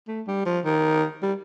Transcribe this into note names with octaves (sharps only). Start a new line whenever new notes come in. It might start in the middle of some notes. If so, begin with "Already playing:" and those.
A3
G3
F3
D#3
G3